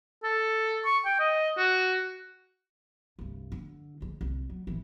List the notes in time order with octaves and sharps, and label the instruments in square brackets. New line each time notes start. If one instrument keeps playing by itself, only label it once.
[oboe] A4
C#6
G5
D#5
F#4
[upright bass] C2 G2
D3
F3 G#3
C2
F#3
D1 E3